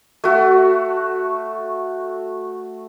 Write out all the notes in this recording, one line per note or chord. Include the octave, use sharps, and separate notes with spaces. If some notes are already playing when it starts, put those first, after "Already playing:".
A3 F#4